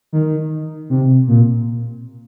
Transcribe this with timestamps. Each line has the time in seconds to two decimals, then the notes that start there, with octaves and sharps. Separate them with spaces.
0.13 D#3
0.90 C3
1.28 A#2